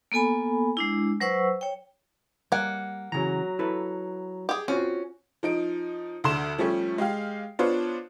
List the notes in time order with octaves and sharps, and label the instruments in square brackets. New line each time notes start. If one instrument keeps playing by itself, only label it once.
[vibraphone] A#3 B3 A4 G#5 B5
G#3 D4 E4
F#3 B4 C5 F#5 C#6 E6
C#5 G5
[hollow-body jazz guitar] G3 [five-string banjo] A#3 G#5 [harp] F#5
[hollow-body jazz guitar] C#3 E3 [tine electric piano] F#3 A#5
[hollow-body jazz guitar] E4 A4 B4
[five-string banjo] G4 G#4
[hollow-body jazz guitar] C4 F4 F#4 [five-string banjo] C#4
[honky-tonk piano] F3 D#4 D7
D2 D3 C6 E7
F3 G3 A3 C#4
G#3 G4 F5
B3 D4 F4 C5 C#5